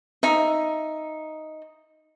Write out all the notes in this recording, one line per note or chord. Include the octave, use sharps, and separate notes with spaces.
D#4 E5